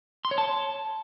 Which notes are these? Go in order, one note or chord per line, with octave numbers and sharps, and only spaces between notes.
C6
C#5
A5